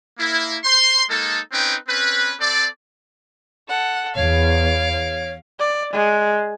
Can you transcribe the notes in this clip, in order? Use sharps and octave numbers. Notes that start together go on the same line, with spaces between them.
A#3 E4
C5 C6
G#3 A#3 D#4 A4
C4 C#4 D#4 B4 G5
C4 C#4 B4
C4 A4 D5
A4 F#5
E2 C#5 F5 D7
C#5
D5
G#3